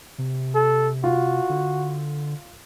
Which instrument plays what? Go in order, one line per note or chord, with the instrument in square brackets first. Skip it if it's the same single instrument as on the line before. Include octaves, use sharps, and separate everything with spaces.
[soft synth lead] C3
[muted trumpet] A4
[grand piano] F4 [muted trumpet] F#4
[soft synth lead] D3